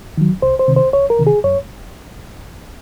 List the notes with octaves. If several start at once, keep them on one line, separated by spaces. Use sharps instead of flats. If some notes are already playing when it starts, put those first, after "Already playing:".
D#3 F#3
C2 C5
C5
C3 D#3
C5
C2 C#5
A#4
C3 D#3
G#4
F#2 C#5